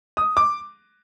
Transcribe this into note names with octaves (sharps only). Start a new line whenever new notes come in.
D#6
D6